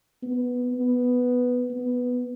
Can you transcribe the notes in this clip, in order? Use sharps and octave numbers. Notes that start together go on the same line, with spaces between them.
B3
B3
B3